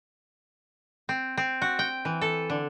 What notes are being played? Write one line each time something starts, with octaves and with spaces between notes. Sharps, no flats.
C4
C4
F#4
G5
E3
A4
D3